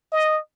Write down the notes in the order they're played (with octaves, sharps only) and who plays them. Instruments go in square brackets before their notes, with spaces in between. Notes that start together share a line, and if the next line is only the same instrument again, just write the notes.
[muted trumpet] D#5